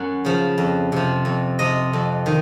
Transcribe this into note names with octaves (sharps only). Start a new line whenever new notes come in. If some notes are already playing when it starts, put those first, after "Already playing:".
Already playing: F#2 F#5
C#3 F3
F2
C3 F3
F2
C3 F3 D#5
F2
D#3